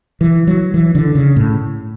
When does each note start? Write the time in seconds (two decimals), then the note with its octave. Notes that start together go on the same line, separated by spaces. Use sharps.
0.21 E3
0.47 F#3
0.74 E3
0.95 D3
1.15 C#3
1.36 A2